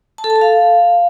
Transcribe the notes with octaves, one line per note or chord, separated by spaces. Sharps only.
A5
A4
A5
A4
F5